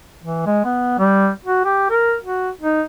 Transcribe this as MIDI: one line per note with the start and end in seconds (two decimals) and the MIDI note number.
0.23 0.45 52
0.46 0.63 56
0.65 0.97 59
0.99 1.30 55
1.45 1.63 66
1.65 1.89 67
1.90 2.16 70
2.22 2.50 66
2.61 2.82 63